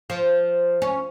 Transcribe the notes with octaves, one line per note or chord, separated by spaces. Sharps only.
F3
C#4